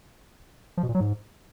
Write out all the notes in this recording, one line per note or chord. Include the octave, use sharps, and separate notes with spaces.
F3
B2
A#2
F#3
G#2